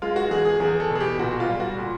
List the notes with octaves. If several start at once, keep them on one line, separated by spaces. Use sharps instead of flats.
G#3 F4
F#4
E2 G#4
G#4
E2 G#4
A4
B2 G#4
G4
A#2 F#4
F4
G3
F#4
A#2